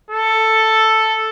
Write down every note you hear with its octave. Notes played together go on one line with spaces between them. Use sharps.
A4